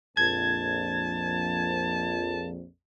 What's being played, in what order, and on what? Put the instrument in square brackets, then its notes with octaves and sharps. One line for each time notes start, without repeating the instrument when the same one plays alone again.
[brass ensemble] A#1 F2 [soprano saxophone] A5 [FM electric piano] G#6